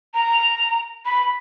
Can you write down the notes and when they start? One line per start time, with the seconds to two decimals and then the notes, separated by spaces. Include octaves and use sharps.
0.14 A#5
1.05 B5